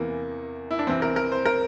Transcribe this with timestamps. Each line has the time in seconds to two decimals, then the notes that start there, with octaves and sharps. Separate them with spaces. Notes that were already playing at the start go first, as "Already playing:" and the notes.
Already playing: E2 C3 E3 A#3
0.71 E4
0.79 D4
0.87 C2 C3 E3 C4
1.02 A#4
1.16 A#4
1.32 C5
1.46 A#4